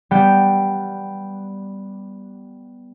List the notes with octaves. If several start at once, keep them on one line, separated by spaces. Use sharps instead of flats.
G3 B3 G5